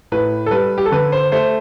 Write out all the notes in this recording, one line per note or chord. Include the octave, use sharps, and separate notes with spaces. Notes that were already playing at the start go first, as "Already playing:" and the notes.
A2 B4
A4
G3 B4
G4
A4
D3 B4
C5
A3 C5